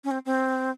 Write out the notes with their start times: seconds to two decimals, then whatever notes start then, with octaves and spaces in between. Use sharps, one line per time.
0.04 C#4
0.11 C4
0.25 C4